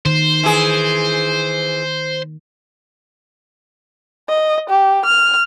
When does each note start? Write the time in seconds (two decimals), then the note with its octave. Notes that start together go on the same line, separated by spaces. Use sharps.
0.06 D#3 C5
0.43 E3 G#4
4.29 D#5
4.69 G4
5.05 F6